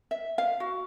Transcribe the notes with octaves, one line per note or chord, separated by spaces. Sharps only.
E5
F5
F#4